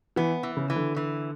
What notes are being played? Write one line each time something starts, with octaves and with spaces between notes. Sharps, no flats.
E3 B3
E3
C#3
E3
D3
E3